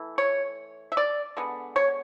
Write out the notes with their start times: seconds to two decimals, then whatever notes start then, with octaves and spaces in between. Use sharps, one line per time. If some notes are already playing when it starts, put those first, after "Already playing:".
Already playing: E3 A3
0.18 C#5
0.92 E5
0.97 D5
1.37 D3 G#3 B3
1.76 C#5